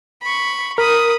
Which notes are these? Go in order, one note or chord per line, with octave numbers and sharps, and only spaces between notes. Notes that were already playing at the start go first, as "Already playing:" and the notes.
B5 C#6
A#4 B5 D#6